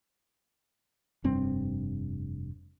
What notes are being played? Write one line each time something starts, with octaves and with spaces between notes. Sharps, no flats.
F1 G2 C4